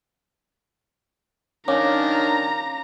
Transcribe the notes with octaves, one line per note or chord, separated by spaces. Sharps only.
D#3 C#4 D4 A#4 C#5 F5 A#5 D6